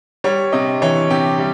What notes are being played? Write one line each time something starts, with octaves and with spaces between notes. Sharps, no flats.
G3 C#5
C3 D#5
E3 C#5
C3 G4
G3